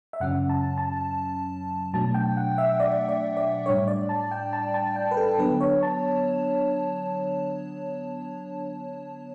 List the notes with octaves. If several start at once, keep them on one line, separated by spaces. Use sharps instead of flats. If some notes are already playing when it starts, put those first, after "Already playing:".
E5
F#2 C#3 F#3 C#4 F#5
A5
A5
B2 F#3 A3 D4 A5
G5
F#5
E5
D5
D5
D5
A2 G3 D4 C#5
D5
A5
G5
A5
A5
G5
B4
A4
D3 F#3 B3 D4 B4
C#5
A5